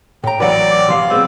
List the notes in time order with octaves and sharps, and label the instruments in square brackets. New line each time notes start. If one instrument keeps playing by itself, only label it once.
[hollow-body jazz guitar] A2 A#5 [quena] G5
[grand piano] A1 F#3 [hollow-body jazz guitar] B4 F#5 [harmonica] D5
[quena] D6
[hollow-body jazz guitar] C2 F3 F5 [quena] C6
[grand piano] G#3 B3 C4 [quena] E6